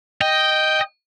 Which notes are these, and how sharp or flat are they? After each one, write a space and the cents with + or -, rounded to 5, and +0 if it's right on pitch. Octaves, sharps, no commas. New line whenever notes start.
D#5 +0 G5 +0